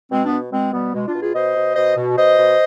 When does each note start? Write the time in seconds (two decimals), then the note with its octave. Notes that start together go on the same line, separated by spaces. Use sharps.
0.10 B2 G#3 C4
0.25 B3 D4
0.32 B2
0.51 B2 G#3 C4
0.72 B2 G3 B3
0.93 B2 G#3
1.07 D4 F4
1.14 B2
1.21 F4 G#4
1.34 B2 C5 D#5
1.55 B2
1.76 B2 C5 D#5
1.97 B2
2.17 B2 C5 D#5
2.37 B2